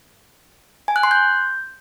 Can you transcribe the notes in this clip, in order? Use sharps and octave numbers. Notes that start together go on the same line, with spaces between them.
G#5
F#6
C6
G6